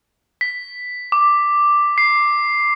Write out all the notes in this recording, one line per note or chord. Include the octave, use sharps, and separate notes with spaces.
B6
D6
C7